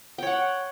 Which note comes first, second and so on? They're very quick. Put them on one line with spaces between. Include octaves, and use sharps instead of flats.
G5 C#5 F#5